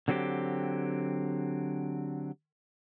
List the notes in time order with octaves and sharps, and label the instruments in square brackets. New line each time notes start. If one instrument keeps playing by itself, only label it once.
[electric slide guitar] D3 F#3 C4 F#4 G4